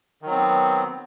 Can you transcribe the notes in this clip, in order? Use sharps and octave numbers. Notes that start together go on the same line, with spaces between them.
D#3 F#3 B3 C4